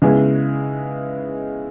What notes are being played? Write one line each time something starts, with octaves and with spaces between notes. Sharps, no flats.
C#3 G#3 B3 E4 G#4